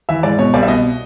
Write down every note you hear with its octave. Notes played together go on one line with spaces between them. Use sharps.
E3 E5
G#2 D5
B2 C#5
C2 D5
E5
B2 D#5